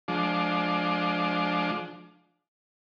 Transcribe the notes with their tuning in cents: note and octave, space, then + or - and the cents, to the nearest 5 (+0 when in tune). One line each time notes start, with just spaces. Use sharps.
F3 +20 G#3 +30 D4 +5